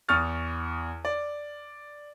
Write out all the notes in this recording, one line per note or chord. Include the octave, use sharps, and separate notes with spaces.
E2 C#6 D#6 F6 A6
D5